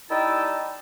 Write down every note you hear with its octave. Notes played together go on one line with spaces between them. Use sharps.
G3 D#4 E4 G5 A5 E6